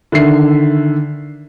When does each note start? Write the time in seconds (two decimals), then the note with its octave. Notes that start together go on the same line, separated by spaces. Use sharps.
0.12 D3 D#3 E5 C7